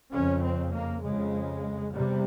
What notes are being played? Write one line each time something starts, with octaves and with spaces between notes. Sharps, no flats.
F2 C#3 C#4
C4
A#3
F2 C#3 G#3
E2 C3 G3